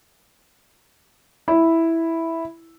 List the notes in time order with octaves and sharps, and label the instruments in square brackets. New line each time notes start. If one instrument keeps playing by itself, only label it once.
[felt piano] E4